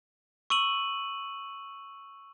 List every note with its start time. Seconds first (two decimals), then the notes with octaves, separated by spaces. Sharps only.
0.50 C#6 E6 D#7 F#7